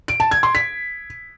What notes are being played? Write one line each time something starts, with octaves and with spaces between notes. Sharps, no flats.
D7
A5
G#6
C6
B6